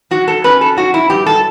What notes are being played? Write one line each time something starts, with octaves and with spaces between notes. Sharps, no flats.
F#3 F#4
A4
C#4 B4
A4
F#3 F#4
E4
G2 G4
A4